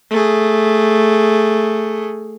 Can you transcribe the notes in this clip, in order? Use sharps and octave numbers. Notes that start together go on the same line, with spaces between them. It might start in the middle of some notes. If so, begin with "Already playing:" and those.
A3 G#4